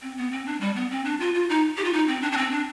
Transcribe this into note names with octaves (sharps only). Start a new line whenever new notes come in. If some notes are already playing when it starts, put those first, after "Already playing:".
C4
B3
C4
D4
G3
B3
C4
D4
F4
F4
D#4
G4
F4
D#4
C4
D4
D4
C4
D4